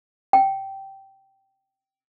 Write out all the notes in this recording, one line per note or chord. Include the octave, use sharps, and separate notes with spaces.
G5